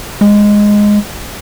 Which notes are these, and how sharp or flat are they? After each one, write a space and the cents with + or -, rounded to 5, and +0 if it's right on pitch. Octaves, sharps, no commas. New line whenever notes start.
G#3 -5